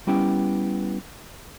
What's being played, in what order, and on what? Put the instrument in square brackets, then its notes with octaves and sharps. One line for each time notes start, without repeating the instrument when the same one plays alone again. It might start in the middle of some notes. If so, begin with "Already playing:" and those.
[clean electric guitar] G3 B3 C#4 E4 G4 G5